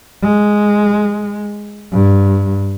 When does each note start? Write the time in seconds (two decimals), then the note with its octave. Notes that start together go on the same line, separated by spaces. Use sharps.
0.23 G#3
1.92 G2